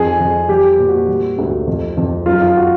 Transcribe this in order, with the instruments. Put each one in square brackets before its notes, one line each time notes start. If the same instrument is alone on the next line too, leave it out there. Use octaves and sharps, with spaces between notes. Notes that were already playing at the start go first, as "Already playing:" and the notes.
Already playing: [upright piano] F2 G#4
F2
G3 G4
A#2
F#4
G3
D2
F2
F2
F#2 F4
F4
F#4